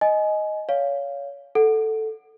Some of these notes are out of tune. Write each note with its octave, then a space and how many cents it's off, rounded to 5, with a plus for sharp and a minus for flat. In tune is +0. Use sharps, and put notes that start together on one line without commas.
D#5 +0 G#5 +20
C#5 +25 F5 +0
A4 +0 F#5 +0